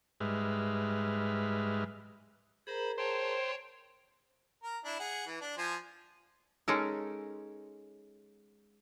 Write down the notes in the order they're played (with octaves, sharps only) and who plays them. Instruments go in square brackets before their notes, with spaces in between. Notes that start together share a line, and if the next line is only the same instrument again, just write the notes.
[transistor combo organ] G#2 G3 G#3 B4 E5 F6
[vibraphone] G#4 A#4 A#5 [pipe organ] C5 B5
[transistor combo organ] C5 [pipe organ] C#5 G5 A5
[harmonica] A#4
D4 E4
G#4 F#5
E3
D4
F3 C5 G#5
[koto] G#3 C#4 D#4 A4 A#4